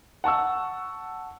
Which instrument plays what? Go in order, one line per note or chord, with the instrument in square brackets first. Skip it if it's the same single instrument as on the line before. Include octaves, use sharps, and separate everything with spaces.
[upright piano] F#5 A5 C#6 E6